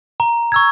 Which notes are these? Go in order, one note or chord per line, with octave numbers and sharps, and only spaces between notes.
A#5
C#6 E6 G#6